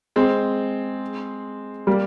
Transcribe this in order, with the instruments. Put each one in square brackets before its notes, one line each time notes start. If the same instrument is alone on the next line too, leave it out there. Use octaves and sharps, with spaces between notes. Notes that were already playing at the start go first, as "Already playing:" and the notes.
[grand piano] G#3 C4
G3 A#3